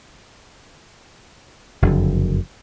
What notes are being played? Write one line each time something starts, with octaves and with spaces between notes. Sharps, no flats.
F#1 F2 D3